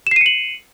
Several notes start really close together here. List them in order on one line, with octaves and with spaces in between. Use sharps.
E7 C7 D#7 C#7 F#7